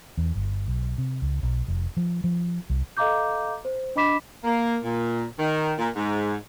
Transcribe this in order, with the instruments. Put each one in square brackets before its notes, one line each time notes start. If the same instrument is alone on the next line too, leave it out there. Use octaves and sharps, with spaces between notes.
[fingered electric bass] E2
G1
B1
C3
C#2
B1
F1
F3
F3
C2
[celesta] A4 D#5 F5 A#5 D6 G6
C5
D4 D#5 B5 D6 B6 E7
[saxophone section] A#3
A#2
D#3
A#2
G#2